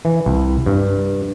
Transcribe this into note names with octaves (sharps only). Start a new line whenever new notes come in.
E3
C2
G2